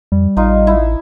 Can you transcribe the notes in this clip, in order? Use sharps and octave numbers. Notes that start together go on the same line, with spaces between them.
F2 G3
A1 D#4 F4
E4